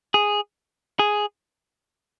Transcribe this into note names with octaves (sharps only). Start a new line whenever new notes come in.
G#4
G#4